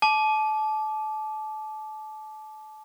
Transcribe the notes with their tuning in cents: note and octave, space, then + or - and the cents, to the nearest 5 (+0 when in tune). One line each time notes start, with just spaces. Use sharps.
A5 -30 D6 +0